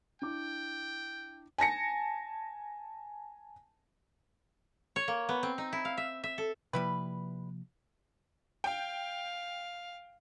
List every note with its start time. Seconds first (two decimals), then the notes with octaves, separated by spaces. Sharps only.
0.22 D4 E4 G5 D6
1.58 G#5 A5 A#6 C#7
4.96 C#5
5.08 A#3
5.29 B3
5.43 C4
5.58 D#4
5.73 E4
5.85 F5
5.98 E5
6.24 E5
6.38 A4
6.73 C3 F3 G3 A#3 E4 B4
8.64 F5 G5